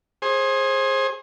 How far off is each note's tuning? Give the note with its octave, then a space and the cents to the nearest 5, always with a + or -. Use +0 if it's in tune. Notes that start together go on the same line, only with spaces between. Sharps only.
G#4 +0 C5 +30